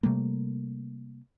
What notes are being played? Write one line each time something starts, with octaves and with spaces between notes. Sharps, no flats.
C3 G3 A3 A#3